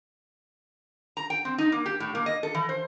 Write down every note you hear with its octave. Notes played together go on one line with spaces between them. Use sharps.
A#5
G5
C4
D#4
A#3
G4
A2
A#3
D#5
A4
E3
C5